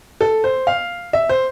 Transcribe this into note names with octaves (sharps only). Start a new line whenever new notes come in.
A4
C5
F5
E5
C5